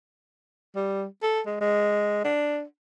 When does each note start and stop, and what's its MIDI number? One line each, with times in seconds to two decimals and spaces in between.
0.76 1.05 55
1.22 1.41 69
1.46 1.59 56
1.61 2.21 56
2.24 2.63 62